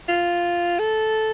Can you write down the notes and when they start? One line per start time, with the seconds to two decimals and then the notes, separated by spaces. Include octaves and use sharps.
0.09 F4
0.79 A4